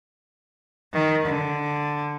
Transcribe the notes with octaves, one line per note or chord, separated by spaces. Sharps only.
D#3
D3